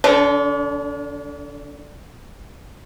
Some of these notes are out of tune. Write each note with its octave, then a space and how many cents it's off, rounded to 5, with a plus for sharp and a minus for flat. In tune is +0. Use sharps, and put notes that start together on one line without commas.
D3 +0 D4 -45